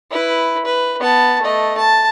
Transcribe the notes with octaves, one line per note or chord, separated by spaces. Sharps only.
E4 B4
B4
B3 A5
A3 D#5
A5